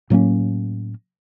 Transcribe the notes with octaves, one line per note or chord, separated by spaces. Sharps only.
A2 F#3 A#3 C#4